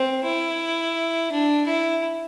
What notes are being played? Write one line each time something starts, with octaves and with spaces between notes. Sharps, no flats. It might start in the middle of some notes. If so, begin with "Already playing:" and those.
Already playing: C4
E4
D4
E4